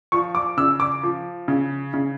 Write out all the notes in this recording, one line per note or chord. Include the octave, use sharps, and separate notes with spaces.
F3 C#6
D6
C#3 E6
D6
F3
C#3
C#3